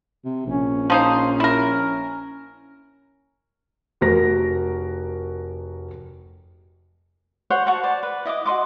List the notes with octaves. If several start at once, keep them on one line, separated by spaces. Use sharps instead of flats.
C3
A#1 C#4
F3 D#4 C5
E4 A#4
F1 F#4 A#4 A#6
C5 C#5 F#5 C#6
F#4 F#5 A5 C#6
C5 D5
B4
E4 D#5 E5 D6
F#4 D#5 C6 D6